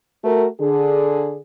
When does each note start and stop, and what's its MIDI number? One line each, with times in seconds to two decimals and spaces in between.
0.24 0.47 57
0.24 0.47 66
0.24 0.47 70
0.60 1.39 50
0.60 1.39 68